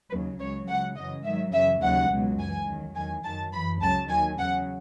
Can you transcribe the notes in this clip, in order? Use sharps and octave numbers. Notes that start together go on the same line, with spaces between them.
D#2 C#3 F#3 B4
C#2 C#3 F#3 C#5
C#2 C#3 F#3 F#5
F#2 C#3 E3 D#5
G#2 D#3 F#3 E5
F#2 C#3 E3 E5
D#2 C#3 F#3 F#5
C#2 B2 F#3
F#2 E3 G#5
E2 D#3 F#3
E2 D#3 F#3 G#5
F#2 D#3 F#3 A5
F#2 E3 B5
C#2 C#3 F#3 A5
D#2 D#3 F#3 G#5
E2 C#3 F#3 F#5